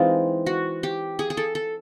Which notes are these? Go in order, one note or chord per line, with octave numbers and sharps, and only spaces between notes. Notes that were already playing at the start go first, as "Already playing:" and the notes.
Already playing: E3 G#3 C4 D#4 F4
F#4
G4
G#4
G#4
A4
A4